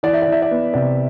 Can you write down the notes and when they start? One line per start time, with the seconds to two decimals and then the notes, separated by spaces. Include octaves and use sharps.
0.03 E3 D5
0.13 E5
0.22 D5
0.28 E3 E5
0.42 D5
0.51 B3
0.74 C3 D5